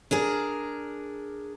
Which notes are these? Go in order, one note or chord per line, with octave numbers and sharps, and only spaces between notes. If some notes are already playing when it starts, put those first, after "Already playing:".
D4 G#4 A#4